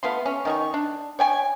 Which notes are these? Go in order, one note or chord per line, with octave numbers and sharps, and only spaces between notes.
A3 B3 F4 C6
C#4
D#3 D#4 C#6
D4
C#5 G5 G#5